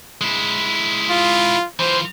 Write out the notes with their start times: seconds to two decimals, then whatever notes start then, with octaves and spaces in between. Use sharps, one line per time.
0.21 G#3 E4
1.10 F4
1.79 E3 F4 C5